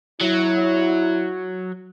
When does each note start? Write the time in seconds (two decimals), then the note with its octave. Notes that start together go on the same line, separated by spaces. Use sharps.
0.21 F#3 E4